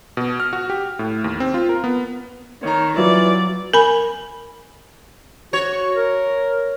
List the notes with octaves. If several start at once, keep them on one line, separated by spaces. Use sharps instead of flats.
B2
F6
F#4
G4
A2
D#2
C4
F4
A#4
B3
D#3 C#5 A#5
E3 F#3 F4 D5
A#4 G#5 B5
F#4 C#5
A#4